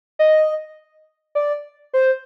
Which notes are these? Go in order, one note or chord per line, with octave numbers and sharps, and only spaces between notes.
D#5
D5
C5